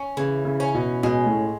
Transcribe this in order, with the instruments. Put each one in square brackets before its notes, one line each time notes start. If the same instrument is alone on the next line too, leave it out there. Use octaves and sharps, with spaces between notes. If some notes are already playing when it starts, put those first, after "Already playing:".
Already playing: [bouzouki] C#4
[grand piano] C#3 [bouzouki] E3
[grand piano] C#3
[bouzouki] C#4
[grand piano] B2
[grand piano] B2 [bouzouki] G#3
[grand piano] A2